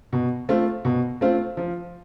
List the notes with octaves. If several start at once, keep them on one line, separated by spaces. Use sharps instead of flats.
B2
A3 C4 F4
B2
A3 C4 F4
F3